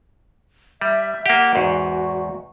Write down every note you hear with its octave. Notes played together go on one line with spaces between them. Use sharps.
G3 E5
A#3 G4 F#5
E2 G#2 F#4